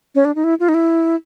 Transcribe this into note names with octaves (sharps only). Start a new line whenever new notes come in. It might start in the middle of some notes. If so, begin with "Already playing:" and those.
C#4
D4
D#4
E4
F4
D#4
E4